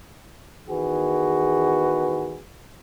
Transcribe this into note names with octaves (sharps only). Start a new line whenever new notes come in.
E2 D#3 F#4 G#4 B4